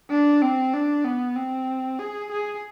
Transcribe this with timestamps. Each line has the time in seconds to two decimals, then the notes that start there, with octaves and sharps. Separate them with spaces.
0.10 D4
0.42 C4
0.73 D4
1.05 B3
1.36 C4
1.99 G#4
2.32 G#4